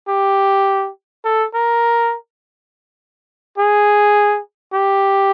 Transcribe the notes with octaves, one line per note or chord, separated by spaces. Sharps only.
G4
A4
A#4
G#4
G4